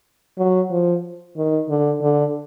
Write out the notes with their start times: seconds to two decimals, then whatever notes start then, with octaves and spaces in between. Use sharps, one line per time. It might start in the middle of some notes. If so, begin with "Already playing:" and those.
0.38 F#3
0.70 F3
1.37 D#3
1.69 D3
2.01 D3